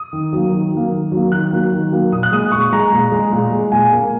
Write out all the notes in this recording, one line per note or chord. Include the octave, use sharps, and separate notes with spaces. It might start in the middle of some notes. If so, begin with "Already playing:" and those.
Already playing: D#6
D#3
F#3 A#3
D#3
F#3 A#3
D#3
F#3 A#3
D#3 F#6
F#3 A#3
D#3
F#3 A#3
A#2 D#6
F#6
G#3 D#6
A#2 C#6
G#3 A#5
A#2
G#3
A#2
G#3
A#2 G#5
A#3